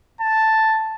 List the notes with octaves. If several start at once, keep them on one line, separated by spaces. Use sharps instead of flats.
A5